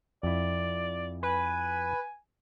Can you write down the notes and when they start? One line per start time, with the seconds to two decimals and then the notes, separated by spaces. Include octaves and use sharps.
0.23 F2 E4 D5
1.23 B4 G#5